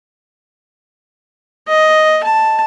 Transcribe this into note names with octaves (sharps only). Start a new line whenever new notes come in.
D#5
A5